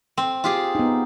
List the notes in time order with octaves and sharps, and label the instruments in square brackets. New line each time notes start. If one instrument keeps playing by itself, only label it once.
[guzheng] C4
F4 G4 G#4
[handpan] B3 D#4